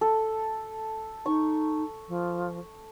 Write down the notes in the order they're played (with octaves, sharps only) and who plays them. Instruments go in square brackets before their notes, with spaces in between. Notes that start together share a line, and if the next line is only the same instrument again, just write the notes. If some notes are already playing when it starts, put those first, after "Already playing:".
[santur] A4
[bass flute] D#4 [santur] C#6
[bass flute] F3